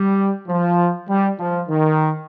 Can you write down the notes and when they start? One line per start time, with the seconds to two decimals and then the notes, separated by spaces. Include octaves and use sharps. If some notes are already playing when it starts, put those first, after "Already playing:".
Already playing: G3
0.48 F3
1.09 G3
1.40 F3
1.69 D#3